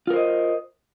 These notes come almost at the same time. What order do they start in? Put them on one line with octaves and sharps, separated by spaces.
F4 A#4 C5 D#5